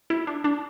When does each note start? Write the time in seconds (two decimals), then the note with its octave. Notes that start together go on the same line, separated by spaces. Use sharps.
0.10 E4
0.27 D4
0.44 D4